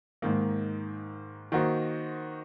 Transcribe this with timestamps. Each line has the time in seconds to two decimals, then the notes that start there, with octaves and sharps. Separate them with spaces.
0.22 G#2 D#3 A#3
1.52 D#3 A#3 D#4 F#4 C5